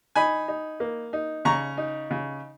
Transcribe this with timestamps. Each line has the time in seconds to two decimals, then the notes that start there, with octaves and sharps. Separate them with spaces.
0.15 D#4 G#5 B5
0.48 D#4
0.80 A#3
1.13 D#4
1.45 C#3 A#5 C#6
1.77 D#4
2.11 C#3